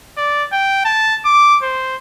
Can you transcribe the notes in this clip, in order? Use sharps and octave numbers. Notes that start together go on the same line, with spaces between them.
D5
G5
A5
D6
C5